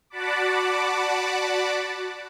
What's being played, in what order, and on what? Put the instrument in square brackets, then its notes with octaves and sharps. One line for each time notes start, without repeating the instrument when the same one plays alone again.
[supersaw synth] F#4 D5 F#5 A5 B5 D6